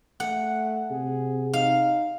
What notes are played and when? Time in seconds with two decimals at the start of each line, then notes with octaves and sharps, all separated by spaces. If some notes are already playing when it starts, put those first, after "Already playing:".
0.20 A3 F#5
0.91 C3 G#4
1.53 D#4 F5